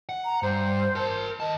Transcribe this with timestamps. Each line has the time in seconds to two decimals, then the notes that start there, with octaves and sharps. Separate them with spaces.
0.09 F#5
0.25 A#5
0.43 G2 C5
0.95 A#4 A5
1.40 D#2 D#5 A5